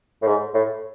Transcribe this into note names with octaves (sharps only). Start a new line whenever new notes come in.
A2
G#2
A2